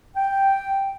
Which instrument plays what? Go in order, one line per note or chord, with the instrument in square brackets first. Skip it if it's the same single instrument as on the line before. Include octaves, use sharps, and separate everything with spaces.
[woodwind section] G5